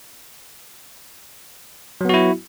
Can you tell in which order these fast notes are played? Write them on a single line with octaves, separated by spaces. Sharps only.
F#3 B3 F#4 E4